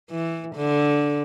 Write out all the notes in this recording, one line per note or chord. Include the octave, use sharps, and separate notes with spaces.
E3
D3